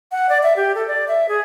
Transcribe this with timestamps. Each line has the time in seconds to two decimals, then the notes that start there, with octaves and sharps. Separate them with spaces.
0.12 F#5
0.29 D5
0.43 E5
0.56 G4
0.75 A4
0.88 D5
1.08 E5
1.29 G#4